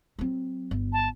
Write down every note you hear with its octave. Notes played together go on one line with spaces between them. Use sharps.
F#3 C4
G1
A5